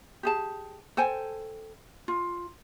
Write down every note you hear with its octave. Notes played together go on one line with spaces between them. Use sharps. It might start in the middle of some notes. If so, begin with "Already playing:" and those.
G4 G#4 A5
A4 C5 G5 G#5
F4